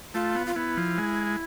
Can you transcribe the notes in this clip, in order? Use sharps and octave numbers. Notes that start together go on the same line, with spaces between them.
A3 F4
B3
F4
B3 E4
F3
G#3